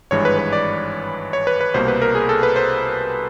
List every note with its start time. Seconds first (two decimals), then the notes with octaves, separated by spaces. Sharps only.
0.11 G#1 G2 E3 G#3 C#5
0.25 B4
0.39 B4
0.53 D5
1.33 C#5
1.47 B4
1.61 B4
1.74 C2 B2 G3 A#3 C5
1.88 B4
2.02 A#4
2.15 G#4
2.29 A4
2.43 B4
2.56 C5